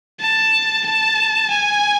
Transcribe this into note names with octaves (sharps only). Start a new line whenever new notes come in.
A5
A5
G#5